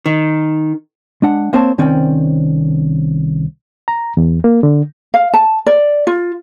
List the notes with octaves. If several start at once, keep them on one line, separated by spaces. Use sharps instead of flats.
D#3
G#3 D4 F#5
A#3 C4 C5 C#5 A5
C2 D#3 C4 C#4 D5 G5
A#5
E2
A#3
D3
F5
A5
D5
F4